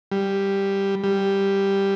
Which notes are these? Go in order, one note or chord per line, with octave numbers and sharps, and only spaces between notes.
G3
G3